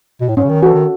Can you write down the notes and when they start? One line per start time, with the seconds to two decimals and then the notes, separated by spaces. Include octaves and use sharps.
0.21 B2
0.29 A2
0.37 G#2 C#4
0.44 C#3
0.49 D#3
0.62 E3 F#4 A4
0.75 D#3